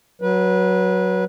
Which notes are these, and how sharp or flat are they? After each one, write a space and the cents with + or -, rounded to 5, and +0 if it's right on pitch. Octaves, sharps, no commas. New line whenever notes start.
F#3 +0 B4 -25